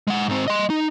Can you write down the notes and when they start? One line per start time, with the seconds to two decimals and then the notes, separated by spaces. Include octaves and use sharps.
0.08 G#3 F#5
0.28 G#2 C4
0.48 D#5 C6
0.70 D#4